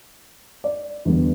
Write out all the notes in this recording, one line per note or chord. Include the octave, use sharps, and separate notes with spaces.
D5
E2 D3 G3 B3